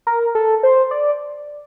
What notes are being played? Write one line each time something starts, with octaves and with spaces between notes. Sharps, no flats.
A#4
A4
C5
D5